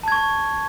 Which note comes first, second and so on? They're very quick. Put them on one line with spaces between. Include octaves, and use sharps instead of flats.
A5 G#6 C#6